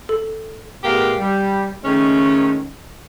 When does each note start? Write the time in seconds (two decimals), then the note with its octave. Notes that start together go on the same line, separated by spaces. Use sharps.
0.09 A4
0.84 A2 G#3 B3 G4 A#4 F5
1.20 G3
1.85 D#3 G#3 A3 C#4